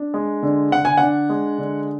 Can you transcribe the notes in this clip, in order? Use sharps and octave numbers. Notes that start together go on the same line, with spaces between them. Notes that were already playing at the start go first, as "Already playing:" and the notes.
Already playing: D4
G#3
D3
D3 F#5
G#5
D4 F#5
G#3
D3